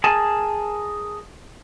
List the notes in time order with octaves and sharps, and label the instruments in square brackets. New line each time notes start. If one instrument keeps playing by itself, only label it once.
[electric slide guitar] G#4 A#4 G#5 A5